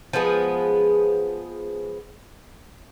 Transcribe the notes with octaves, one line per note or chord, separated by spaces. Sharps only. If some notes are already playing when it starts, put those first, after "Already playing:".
F3 G#3 B3 G#4